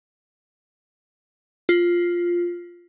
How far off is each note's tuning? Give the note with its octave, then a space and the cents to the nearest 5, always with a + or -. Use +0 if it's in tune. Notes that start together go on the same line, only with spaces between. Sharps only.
F4 +0